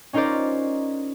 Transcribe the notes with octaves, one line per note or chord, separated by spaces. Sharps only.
C#4 D#4 F4 A#4 C5 D5